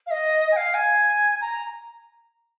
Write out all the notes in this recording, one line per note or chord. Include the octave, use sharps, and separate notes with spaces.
F5
D#5
G#5
F5
G#5
A#5